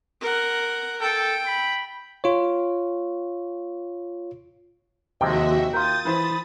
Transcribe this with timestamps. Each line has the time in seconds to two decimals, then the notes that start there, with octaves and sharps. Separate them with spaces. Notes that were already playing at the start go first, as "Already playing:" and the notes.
0.21 A#4 F#5
1.01 A4 G5
1.46 B5
2.24 F4 C#5
5.21 D#2 C3 F3 G#3 F#4 D#5 E5 G5
5.73 F4 A#4 D#6 G6 A6
6.05 E3 C5 B5